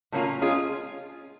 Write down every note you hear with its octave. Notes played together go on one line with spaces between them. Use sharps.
A2 F#3 A#3 C#4 F4
G#3 C#4 F4 G#4